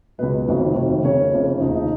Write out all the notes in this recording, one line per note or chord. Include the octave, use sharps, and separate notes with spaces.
C#2 B2 F#3 B4 D#5
F1 F2 D#3 F#3
F1 F2 D#3 F#3
F1 F2 C#3 A#4 C#5
F1 F2 C#3
F1 D#2 C#3 F3 D#4
D#4